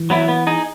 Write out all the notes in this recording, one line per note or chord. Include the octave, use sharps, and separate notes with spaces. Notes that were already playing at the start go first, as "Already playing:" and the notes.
Already playing: E3
F#3 B3 E4
B3
D#4 G#4